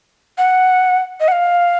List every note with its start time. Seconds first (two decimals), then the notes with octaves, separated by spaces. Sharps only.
0.38 F#5
1.20 D#5
1.28 F#5
1.32 F5